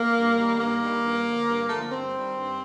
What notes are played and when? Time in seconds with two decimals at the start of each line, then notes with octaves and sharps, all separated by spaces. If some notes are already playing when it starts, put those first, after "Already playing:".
Already playing: A#3
0.14 G2
0.37 D#3 G3
0.58 G2 A#3
0.80 D#3 G3
1.02 G2
1.25 D3 F3
1.47 G2
1.69 D3 F3 A3
1.80 A#3
1.91 G2 C4
2.14 D#3 G3
2.36 G2